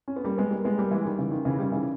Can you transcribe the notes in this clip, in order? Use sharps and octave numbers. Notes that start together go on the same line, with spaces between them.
C#4
B3
G3 A#3
G#3 B3
G3 A#3
G#3 B3
G3 A#3
E3 G#3
D#3 G3
C#3 E3
D#3
C#3 E3
D#3 G3
C#3 E3